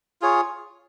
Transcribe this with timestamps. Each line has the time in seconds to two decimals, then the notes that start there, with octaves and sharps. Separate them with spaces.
0.21 F4 G#4 C#5